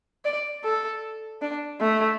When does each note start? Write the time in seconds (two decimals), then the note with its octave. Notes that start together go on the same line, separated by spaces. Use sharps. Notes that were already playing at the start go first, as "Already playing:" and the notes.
0.25 D5
0.64 A4
1.42 D4
1.81 A3